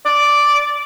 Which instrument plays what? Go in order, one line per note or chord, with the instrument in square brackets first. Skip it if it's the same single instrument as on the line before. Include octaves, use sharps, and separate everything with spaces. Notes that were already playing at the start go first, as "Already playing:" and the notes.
[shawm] D5